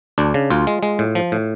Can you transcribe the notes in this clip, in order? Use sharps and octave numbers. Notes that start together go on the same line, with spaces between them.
D2 D4
C#3
D2 F4
G#3
G#3
A2
F3
A2